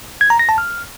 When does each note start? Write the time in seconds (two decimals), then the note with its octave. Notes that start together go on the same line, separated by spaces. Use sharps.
0.21 G#6
0.30 A#5
0.39 A#6
0.49 A5
0.58 F6